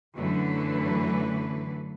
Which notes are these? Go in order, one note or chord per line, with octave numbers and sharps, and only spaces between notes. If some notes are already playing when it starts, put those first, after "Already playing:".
F#2 D3 E3 F#3 A3 B4